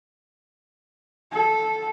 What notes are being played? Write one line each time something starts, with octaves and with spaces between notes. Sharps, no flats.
A4